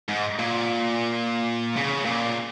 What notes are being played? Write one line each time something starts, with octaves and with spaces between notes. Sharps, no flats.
G#2
A#2
C#3
A#2